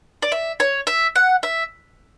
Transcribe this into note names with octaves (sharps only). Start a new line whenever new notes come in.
D5
E5
C#5
E5
F#5
E5